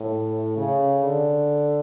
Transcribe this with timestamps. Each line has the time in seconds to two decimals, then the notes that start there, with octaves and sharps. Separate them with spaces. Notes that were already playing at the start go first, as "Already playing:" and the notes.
Already playing: A2
0.57 C#3
1.03 D3